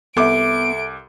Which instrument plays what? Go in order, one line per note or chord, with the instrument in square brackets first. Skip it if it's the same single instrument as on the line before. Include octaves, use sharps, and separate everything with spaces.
[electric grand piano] C2 D6 [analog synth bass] B3 [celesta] A4 E5 [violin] D7